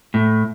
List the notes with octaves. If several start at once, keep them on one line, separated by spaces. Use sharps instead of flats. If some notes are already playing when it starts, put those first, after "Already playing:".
A2